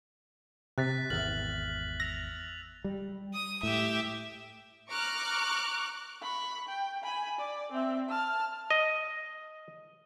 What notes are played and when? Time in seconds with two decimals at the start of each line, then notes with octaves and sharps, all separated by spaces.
0.78 C3 F#6 A6 B6
1.10 G#1 E2 E5 F6 A6 F#7
2.00 E6 A#6 F7
2.84 G3
3.34 D#6
3.63 A2 G4 E5
4.89 A#5 C#6 D6 F6 F#6
6.22 B5 C#6
6.69 G5
7.03 G#5 B5
7.39 D5
7.72 C4 E5
8.09 A5 F6
8.70 D#5